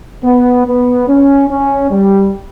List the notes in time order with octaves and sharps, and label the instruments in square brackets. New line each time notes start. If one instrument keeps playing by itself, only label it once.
[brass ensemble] B3
B3
C#4
C#4
G3